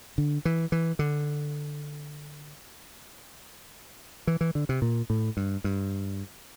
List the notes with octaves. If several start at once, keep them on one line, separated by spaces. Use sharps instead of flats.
D3
E3
E3
D3
E3
E3
D3
C3
A#2
A2
G2
G2